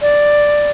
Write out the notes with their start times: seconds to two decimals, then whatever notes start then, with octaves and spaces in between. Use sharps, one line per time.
0.02 D5